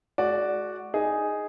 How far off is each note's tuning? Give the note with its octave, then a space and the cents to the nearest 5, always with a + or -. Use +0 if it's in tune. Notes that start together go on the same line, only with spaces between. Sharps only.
G#3 +40 F#4 +0 D5 +0
D#4 +0 G#4 +0